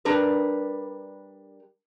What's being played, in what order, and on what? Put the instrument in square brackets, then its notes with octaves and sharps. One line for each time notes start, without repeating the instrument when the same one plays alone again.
[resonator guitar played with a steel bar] G3 D4 A#4 B4